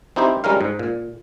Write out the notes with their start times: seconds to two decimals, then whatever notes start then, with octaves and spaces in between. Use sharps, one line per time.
0.16 C4 D#4 E4 G4 C5
0.44 G3 G#3 C#4 A#4 F5
0.61 G#2
0.79 A#2